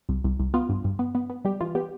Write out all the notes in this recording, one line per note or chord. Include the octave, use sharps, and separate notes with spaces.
C2
C2
C2
B3 F4
G2
G2
B3
B3
B3
G3 G4
E3 F4
B3 G4